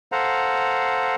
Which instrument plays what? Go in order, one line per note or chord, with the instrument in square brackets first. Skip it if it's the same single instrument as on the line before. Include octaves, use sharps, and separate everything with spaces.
[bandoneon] A4 C5 F5 F#5 A#5